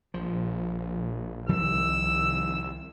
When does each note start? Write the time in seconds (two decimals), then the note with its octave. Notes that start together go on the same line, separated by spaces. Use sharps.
0.14 A#1 F3
1.49 C2 D#3 F3 G3 E6